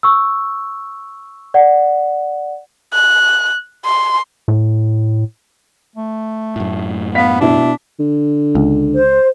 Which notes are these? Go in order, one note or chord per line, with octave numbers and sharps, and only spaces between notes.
C#6 E6
D5 F#5
F#6
C6
A2
A3
F#2 A2
B3 F5 B6
B2 D4 E4
D3
C#2
C5